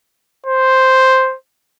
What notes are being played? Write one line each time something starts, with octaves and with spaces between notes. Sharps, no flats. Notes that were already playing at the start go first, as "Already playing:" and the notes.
C5